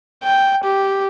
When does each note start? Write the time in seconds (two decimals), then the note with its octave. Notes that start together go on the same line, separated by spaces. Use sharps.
0.24 G5
0.64 G4